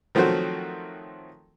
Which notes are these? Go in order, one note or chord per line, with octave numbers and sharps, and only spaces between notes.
D#3 F3 F#3 A3 C4 F#4